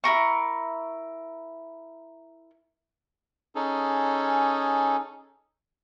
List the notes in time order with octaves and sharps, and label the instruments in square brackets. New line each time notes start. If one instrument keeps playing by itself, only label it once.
[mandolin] E4 F4 A#4 C#6
[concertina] C#4 D#4 G#4 A4